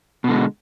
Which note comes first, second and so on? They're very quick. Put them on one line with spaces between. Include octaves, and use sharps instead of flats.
B2 D3 G#3